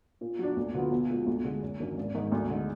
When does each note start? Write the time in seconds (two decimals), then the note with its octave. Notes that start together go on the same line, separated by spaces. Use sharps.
0.21 A#2
0.39 F#3 D4
0.56 D2
0.74 D3 F#3 B3 F4
0.91 B1
1.10 A#2 G#3
1.26 D2
1.45 D3 G#3
1.62 F#1
1.80 F#2 D#3 A#3 D4
1.97 G#1
2.15 G#2 D#3 G#3 D#4
2.32 D2
2.50 D3 G#3 D#4